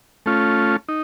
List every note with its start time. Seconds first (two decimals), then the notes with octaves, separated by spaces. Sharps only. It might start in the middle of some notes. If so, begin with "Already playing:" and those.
0.26 A3 C#4 F4
0.89 D#4